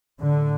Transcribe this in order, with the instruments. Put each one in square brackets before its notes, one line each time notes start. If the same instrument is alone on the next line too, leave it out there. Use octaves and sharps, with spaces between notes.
[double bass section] A2 D3